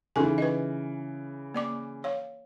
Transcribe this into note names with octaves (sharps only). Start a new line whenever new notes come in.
C#3 E3 D#4 A4 G#5
B4 D#5
A#3 D5 D6
C#5 F5